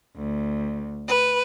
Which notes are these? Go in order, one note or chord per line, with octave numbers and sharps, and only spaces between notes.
D2
B4